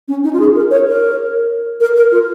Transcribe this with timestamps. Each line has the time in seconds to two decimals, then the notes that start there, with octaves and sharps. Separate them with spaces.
0.08 C#4
0.24 D#4
0.33 F4
0.40 G#4
0.55 A#4
0.71 C#5
0.87 A#4
1.80 A#4
1.96 A#4
2.12 F4